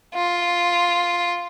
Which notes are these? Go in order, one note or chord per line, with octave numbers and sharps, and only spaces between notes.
F4